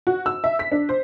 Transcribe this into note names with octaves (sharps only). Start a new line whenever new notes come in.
F#4
E6
E5
B6
D4
C5